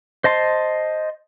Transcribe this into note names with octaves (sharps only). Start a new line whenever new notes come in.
C5 D#5 A5 C6